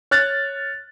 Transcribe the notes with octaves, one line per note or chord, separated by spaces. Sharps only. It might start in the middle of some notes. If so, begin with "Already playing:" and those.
C#5 F6 F#6 A6